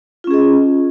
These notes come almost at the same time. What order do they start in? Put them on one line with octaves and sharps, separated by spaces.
F4 C#4 G#4 D#5